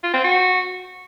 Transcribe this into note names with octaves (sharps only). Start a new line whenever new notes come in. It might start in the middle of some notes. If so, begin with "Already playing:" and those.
F4
C4
F#4